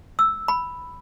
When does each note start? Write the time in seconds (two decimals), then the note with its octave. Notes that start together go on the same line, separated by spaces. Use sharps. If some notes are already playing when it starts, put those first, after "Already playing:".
0.19 E6
0.48 B5